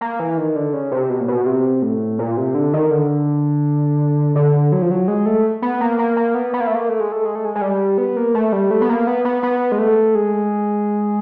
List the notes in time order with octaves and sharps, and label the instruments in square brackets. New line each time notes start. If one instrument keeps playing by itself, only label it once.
[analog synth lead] A#3
E3
D#3
D3
C#3
C3
B2
A#2
B2
C3
A2
A#2
C3
D3
D#3
D3
D3
F#3
F3
F#3
G#3
A3
B3
A#3
A#3
A#3
B3
B3
A#3
A3
A#3
A3
G#3
A3
G#3
A3
G#3
G#3
G3
B3
A#3
A3
G3
A3
B3
A#3
B3
B3
B3
G#3
A3
G#3